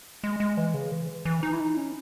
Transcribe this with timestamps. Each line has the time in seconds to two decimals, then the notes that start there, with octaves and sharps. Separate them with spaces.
0.24 G#3
0.40 G#3
0.57 E3
0.74 C#3
0.92 E3
1.25 E3
1.43 D#4
1.53 E4
1.60 D#4
1.77 C#4